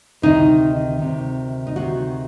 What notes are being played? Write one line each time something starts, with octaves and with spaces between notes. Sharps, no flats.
D2 C3 D#3 D#4
D2 C3 D#3
D#4
D2 C3 D#3 F#4